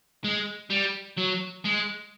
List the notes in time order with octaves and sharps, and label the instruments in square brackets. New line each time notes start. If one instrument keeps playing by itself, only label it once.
[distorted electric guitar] G#3
G3
F#3
G#3